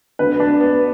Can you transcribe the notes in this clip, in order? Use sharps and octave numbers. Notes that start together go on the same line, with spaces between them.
D2 D3 B4
D4
B3